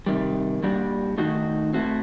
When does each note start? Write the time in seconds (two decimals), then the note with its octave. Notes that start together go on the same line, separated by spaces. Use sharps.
0.06 C3 D#3 G3
0.63 A#2 G3 D4 F#4
1.17 D#3 A3 D#4 F#4
1.73 A2 A3 C4 F#4